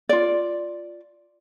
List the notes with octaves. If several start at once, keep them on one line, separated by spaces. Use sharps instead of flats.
F4 D5